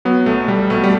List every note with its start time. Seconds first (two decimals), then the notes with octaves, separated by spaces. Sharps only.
0.05 F#3 B3
0.26 B1 A3
0.48 B1 G3
0.70 B2 A3
0.84 G3